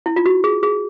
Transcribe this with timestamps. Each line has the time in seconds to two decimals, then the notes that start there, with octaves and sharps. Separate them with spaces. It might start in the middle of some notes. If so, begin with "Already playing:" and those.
0.06 E4
0.16 F4
0.26 F#4
0.44 G#4
0.63 G#4